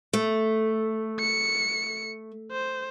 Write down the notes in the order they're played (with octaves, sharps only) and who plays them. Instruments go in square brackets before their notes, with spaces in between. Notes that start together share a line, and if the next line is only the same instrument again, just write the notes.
[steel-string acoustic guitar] A3
[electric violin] C#7
C5